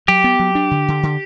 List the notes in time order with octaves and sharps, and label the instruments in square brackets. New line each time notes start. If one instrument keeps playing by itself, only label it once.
[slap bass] F#3 [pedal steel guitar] G4
[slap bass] B3
F#3
D4
D3
D3
D3